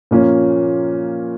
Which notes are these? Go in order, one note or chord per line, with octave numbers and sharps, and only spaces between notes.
A#2 F3 A#3 C#4